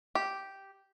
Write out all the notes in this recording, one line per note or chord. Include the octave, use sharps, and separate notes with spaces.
G4